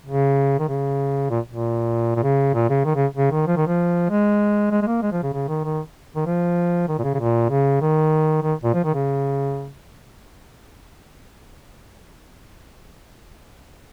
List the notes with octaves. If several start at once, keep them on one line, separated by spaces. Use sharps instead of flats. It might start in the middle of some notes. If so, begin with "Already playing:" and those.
C#3
D#3
C#3
A#2
A#2
A#2
C#3
A#2
C#3
D#3
C#3
C#3
D#3
F3
D#3
F3
G#3
G#3
G#3
A#3
G#3
F3
C#3
C#3
D#3
D#3
D#3
F3
D#3
A#2
C#3
C#3
A#2
C#3
D#3
D#3
A#2
F3
D#3
C#3